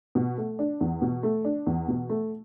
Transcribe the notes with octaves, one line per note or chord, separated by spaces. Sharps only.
B2
A3
D4
E2
B2
A3
D4
E2
B2
A3